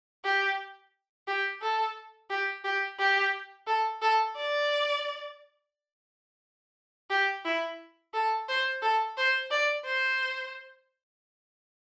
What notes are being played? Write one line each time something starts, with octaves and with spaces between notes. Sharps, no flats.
G4
G4
A4
G4
G4
G4
A4
A4
D5
G4
E4
A4
C5
A4
C5
D5
C5